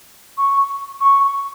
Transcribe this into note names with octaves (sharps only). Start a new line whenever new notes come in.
C#6
C#6